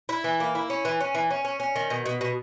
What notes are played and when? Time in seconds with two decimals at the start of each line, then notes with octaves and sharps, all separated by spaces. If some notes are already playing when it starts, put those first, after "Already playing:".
0.09 E4
0.24 E3
0.40 A#3
0.55 E4
0.70 C#4
0.85 E3
1.00 C#4
1.15 E3
1.31 C#4
1.45 C#4
1.60 C#4
1.76 D#3
1.90 B2
2.06 B2
2.21 B2